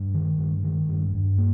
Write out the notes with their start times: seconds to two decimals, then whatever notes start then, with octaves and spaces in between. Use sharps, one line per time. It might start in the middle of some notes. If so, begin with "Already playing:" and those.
Already playing: G2
0.14 D#3
0.39 G2
0.64 D#3
0.89 G2
1.14 G2
1.38 A#3